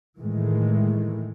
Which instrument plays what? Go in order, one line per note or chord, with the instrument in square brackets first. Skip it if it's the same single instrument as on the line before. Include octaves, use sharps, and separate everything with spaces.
[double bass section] A2 D#3 E3 G#3 A3